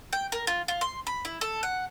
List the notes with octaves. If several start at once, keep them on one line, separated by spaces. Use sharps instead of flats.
G5
A#4
F4
F4
C6
B5
E4
A4
F#5